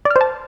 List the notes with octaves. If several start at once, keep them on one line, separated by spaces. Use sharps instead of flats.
D5
F6
C5
A5